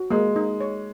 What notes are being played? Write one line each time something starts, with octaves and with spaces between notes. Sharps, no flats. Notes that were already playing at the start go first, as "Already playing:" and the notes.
Already playing: F#4
G#3 A#3
D#4
C#5